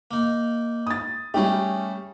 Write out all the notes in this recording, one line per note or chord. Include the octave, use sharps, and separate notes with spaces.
A#3 D#4
D#6 A6
G3 A3 C#4 G4 G#4